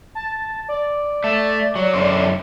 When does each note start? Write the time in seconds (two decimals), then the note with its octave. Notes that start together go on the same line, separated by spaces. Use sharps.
0.15 A5
0.69 D5
1.24 A3
1.75 F#3
1.94 F#2 D3 C5